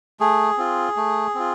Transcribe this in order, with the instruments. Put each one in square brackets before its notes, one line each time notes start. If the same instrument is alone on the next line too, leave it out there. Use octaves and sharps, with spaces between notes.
[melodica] A3 G#4
C4 F4
A3
C4 F4